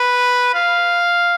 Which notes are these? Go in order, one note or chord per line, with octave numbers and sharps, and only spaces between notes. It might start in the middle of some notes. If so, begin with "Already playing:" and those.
Already playing: B4
F5